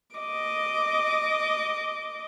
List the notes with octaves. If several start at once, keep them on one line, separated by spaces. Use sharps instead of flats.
D#5 D6